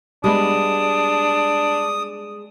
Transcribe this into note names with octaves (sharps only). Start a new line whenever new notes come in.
G3 G#3 B3 D4 D#6